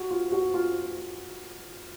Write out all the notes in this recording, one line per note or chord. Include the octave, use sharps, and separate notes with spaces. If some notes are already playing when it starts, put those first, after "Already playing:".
Already playing: F#4
F4
F#4
F4